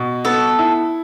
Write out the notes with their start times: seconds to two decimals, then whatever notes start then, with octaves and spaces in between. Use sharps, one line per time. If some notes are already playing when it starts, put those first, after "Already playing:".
Already playing: B2
0.25 B3 A4
0.59 E4